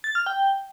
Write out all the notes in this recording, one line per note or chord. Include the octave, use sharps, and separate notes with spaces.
A6
F6
G5